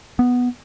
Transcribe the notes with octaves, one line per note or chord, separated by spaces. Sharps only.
B3